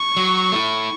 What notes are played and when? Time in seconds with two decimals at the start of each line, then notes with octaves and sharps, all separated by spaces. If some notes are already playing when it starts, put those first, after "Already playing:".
Already playing: C#6
0.17 F#3
0.52 A3 E4